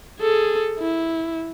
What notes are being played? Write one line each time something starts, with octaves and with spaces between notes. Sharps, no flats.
G#4 A4
E4